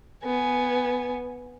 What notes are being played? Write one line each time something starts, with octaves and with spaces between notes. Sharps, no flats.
B3 G#5